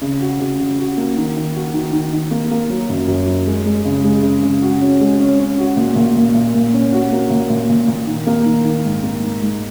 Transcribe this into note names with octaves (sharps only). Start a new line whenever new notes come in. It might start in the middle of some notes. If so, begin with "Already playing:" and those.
C#3
F#4
C#3
C#3
F#4
A#3
D#3
D#3
F#4
D#3
D#3
D#3
A#3
A#3
F#3
F#2
F#2
F#3
G#3
G#3
C#3
G#3
C#3
C#3
F#4
C#4
G#3
C#4
C#4
F#4
A#2
A#2
A#2
A#2
A#2
C#4
F#4
A#3
A#2
A#2
A#2
A#2
D#3
A#3
D#3
D#3
G#2
A#3
G#2
G#2